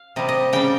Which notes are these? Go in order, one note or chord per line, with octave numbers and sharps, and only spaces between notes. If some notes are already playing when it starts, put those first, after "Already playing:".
Already playing: F5
C3 G3 D#5
D#5
C#3 G3 G5